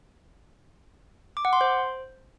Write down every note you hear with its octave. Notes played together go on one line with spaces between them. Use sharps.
D6
F#5
C6
C5